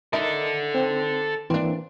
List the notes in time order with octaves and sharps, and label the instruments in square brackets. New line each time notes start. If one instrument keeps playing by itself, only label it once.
[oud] D#4 E4 [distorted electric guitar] A4 D5 [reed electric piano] A#4 D#5 A5
[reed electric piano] C4
[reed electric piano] E3 A#3 [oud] C4 D4